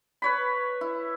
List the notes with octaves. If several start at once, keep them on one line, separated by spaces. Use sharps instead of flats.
B4 C#5 B5
E4